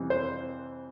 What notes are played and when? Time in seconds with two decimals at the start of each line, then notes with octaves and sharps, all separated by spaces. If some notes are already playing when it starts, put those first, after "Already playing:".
Already playing: F2 C3 E3 G3
0.10 C5